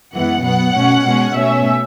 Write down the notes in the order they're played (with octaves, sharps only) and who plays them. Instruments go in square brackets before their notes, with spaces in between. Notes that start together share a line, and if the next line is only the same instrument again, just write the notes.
[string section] F#2 E3 G#3 B3 F#5
B2 F#3 B3 F#5
B2 A3 C#4
B2 G#3 C#4
B2 A3 C#4 E5